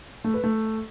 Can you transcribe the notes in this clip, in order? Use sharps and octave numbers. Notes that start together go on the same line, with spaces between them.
A3
B4
A3